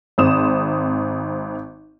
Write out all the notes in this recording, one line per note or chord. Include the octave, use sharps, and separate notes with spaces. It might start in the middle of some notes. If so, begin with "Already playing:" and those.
G#1 C4 D#6 E7